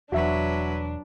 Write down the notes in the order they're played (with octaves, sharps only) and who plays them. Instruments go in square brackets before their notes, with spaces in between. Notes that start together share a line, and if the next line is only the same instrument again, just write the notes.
[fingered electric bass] E1 E2 [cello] F#3 B4 [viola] D4 [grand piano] F#4 E5